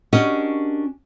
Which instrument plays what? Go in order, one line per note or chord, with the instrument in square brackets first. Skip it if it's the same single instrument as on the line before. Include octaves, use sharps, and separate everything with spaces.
[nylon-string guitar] C#4 D4 F#4 G4 A#4 D#5